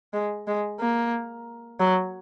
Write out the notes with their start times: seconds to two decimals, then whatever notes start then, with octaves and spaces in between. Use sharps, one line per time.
0.13 G#3
0.47 G#3
0.80 A#3
1.80 F#3